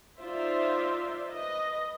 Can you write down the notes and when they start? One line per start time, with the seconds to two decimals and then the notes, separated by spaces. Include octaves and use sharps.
0.21 D#4 F4 C5 D5 E5
1.28 B4 D#5